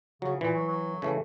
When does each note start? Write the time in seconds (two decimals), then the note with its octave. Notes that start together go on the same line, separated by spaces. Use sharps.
0.22 C#3 F#3
0.41 A#2 E3
0.54 F#3
0.68 F#3
1.02 C#3 E3 A3